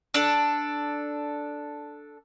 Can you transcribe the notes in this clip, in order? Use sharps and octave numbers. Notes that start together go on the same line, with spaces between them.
D4 A4